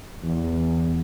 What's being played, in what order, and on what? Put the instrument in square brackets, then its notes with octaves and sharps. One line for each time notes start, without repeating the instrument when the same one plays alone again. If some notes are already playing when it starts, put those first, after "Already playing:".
[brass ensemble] E2